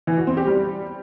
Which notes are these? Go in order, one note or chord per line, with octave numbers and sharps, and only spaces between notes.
E3
F#4
C4
G4
G3